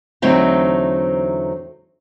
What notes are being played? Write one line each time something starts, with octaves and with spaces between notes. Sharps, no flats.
E2 D3 F#3 A3 C4 D#4